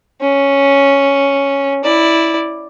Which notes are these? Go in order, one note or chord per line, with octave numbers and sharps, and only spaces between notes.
C#4
E4 D5